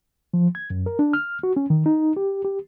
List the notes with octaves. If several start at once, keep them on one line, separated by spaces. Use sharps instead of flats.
F3
G#6
F#2
A#4
D4
F6
F#4
C#4
D#3
D#4
G4
G4